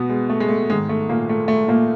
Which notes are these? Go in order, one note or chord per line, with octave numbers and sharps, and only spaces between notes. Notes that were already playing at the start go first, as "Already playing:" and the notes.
Already playing: B2 B3
G#3
A3
G#3
A3
G#2 D#3 G#3
A3
A#2 A#3
A3
A3
A#2 A#3